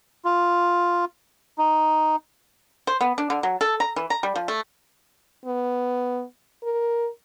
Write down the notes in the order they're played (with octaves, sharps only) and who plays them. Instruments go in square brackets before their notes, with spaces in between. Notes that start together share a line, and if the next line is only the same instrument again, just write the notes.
[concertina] F4
D#4
[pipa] C5
B3
D4
D3
F#3
A4
A#5
E3
A#5
G3
F3
A3
[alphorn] B3
A#4